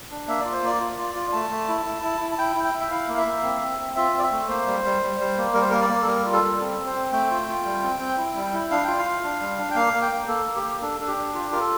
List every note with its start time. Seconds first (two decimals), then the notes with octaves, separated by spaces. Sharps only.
0.11 D4
0.28 A#3 E5
0.41 F4 D5
0.52 C5
0.62 A#3 D5
0.80 F4
0.98 F4
1.15 F4
1.32 A3 A5
1.50 A3
1.68 E4
1.85 E4
2.03 E4
2.21 E4
2.32 A5
2.38 E4 G5
2.56 E4
2.64 G5
2.74 E4
2.81 E5
2.90 E4 F5
3.08 A#3
3.13 F5
3.18 E5
3.26 A#3
3.43 C4
3.61 C4
3.79 C4
3.96 F4 E5
4.13 C4 D5
4.23 E5
4.31 A3
4.49 A#3 C5
4.66 G3
4.84 G3
5.02 G3
5.20 G3
5.37 A#3
5.54 G3 A#4
5.62 C5
5.70 A#3 A#4
5.81 D5
5.89 A#3
6.02 A4
6.07 G3 A#4
6.25 F4
6.33 A4
6.42 G3
6.60 C4 A4
6.78 C4
6.87 C5
6.95 C4
7.12 A3 G5
7.31 F4
7.48 F4
7.65 G3
7.83 C4
8.00 C4
8.18 E4
8.36 G3
8.53 E4
8.71 D4 F5
8.84 F4 G5
8.98 F5
9.05 F4
9.24 D4
9.40 G3
9.59 D4
9.71 G5
9.75 A#3 F5
9.93 A#3
10.02 G5
10.11 A#3
10.28 A#3 A4
10.46 A#3
10.56 G4
10.63 A#3
10.81 D4 A4
10.99 D4 A4
11.08 G4
11.17 D4
11.34 F4 G4
11.51 F4 A#4
11.61 A4